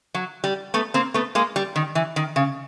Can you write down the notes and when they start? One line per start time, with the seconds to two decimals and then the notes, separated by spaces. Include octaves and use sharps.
0.14 F#3
0.44 G3
0.74 A3 B3
0.94 A#3 C4
1.14 A3 B3
1.35 G#3 A#3
1.56 G3
1.76 D#3
1.95 E3
2.16 D#3
2.36 C#3